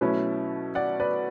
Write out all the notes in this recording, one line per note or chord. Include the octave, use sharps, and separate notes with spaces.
B2 F#3 A3 C#4 E4 B4
D5 F#5
B4 D5